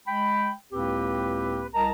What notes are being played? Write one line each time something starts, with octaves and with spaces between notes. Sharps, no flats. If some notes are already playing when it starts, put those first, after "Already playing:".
G#3 G5 B5
C#2 A2 A#3 C4 G4 B4
C2 A#4 D#5 A5 A#5